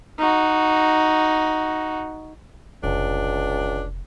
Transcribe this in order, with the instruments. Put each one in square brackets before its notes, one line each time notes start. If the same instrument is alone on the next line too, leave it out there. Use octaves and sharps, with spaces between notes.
[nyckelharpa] D#4 F#4
[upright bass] F1 [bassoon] C#2 [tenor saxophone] D4